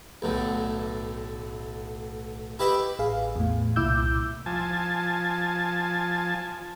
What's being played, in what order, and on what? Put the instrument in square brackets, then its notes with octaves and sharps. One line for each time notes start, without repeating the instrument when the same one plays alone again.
[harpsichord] B1 A2 D3
E4 G4 B4 D#5 E5
[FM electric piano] A1 G#4 F5
E2 A2
C2 A#2 E4 D6 E6 G6
[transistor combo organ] F3 G#5 A5